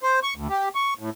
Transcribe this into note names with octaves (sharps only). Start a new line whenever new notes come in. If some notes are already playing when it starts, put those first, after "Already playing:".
C5
C#6
D2
G4
C#6
A2